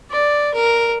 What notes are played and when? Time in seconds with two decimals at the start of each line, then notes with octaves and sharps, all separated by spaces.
0.11 D5
0.54 A#4